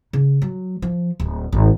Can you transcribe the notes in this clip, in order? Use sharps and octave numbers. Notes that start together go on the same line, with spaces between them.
C#3
F#3
F3
D1
G#1